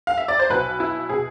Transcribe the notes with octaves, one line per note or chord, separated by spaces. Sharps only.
F5
E5
D5
C5
B1 B2 B4
E4
B2 G#4